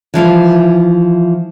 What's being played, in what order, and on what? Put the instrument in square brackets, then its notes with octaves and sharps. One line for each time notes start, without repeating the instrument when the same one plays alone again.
[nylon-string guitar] E3 F3 E4 F4